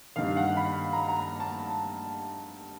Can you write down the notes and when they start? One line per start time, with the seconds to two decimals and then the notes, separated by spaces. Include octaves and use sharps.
0.16 G2 D#3 F5
0.37 F#5
0.57 B5
0.93 A#5
1.08 A#5
1.40 A5